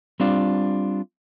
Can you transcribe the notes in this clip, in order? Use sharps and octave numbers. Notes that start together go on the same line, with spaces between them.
G3 C4 D4 F4